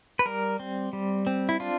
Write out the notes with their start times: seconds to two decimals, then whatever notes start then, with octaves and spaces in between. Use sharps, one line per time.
0.19 B4
0.26 G3 A#4
0.60 C4
0.93 G3
1.27 C4
1.49 E4
1.60 D4 F4